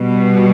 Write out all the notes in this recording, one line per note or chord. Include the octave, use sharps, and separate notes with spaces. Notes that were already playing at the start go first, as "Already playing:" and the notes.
Already playing: B2 G3